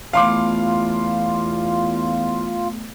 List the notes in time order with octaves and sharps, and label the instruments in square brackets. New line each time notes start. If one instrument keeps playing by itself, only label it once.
[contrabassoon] E2 [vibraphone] A3 B3 [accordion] F4 [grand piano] F5 C6 D6